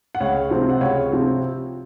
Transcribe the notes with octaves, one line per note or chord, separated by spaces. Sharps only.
F#5
C#2 C#5 F5
C3 F3 C4
F#5
C#2 C#5 F5
C3 F3 C4